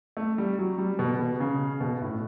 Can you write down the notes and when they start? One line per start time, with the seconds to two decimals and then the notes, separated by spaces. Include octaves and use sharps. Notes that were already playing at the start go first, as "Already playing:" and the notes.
0.17 A3
0.38 G3
0.59 F#3
0.78 G3
0.99 B2
1.19 B2
1.40 C#3
1.81 B2
2.01 A2